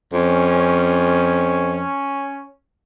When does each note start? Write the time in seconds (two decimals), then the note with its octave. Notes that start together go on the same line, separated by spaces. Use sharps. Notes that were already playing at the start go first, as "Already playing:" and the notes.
0.13 F2 C#4